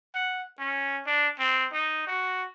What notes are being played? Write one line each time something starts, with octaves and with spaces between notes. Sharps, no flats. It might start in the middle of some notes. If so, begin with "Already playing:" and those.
F#5
C#4
D4
C4
D#4
F#4